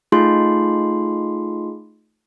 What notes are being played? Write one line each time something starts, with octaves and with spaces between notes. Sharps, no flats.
A3 D#4 F4 G#4 C6